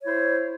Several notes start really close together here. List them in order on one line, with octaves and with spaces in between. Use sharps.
C#5 E4 C5